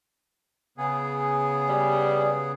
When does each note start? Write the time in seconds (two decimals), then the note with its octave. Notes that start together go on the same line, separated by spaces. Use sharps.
0.78 C#3 B3 G#4
1.69 G3